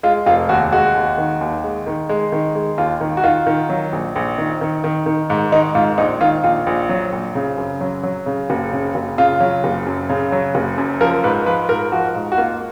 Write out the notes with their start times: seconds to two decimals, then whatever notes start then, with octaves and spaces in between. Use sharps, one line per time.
0.03 G#3 F4
0.26 F1 F4
0.49 D#2 F#4
0.72 G#3 F#4
0.95 D#2
1.18 D#3
1.41 D#2
1.64 G#3
1.87 D#3
2.09 G#3
2.32 D#3
2.55 G#3
2.78 D#2 F4
3.01 D#3
3.17 F#4
3.24 D#3 F4
3.47 D#3
3.69 F#3
3.92 A#1
4.16 A#1
4.38 D#3
4.61 D#3
4.84 D#3
5.06 D#3
5.30 G#2
5.52 D#3 D#4
5.75 G#2 F4
5.98 A#1 D#4
6.21 D#3 F4
6.44 A#1 F4
6.67 A#1
6.89 F#3
7.12 A#1
7.35 C#3
7.58 F#2
7.81 F#3
8.03 F#3
8.26 C#3
8.50 F#1
8.73 C#3
8.95 F#1
9.18 C#3 F4
9.40 F#3
9.64 F#1
9.86 F#2
10.10 C#3
10.32 F#3
10.55 F#1
10.78 F#2
11.00 F3 A#4
11.24 G#2 B4
11.46 F3 B4
11.69 G#2 A#4
11.92 F3 F#4
12.15 G#2
12.32 F#4
12.38 A#3 F4